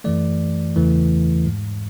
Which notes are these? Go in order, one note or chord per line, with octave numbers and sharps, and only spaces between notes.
F#2 E3 A3 D5
E2 C#3 E3 A3
G#2 G#3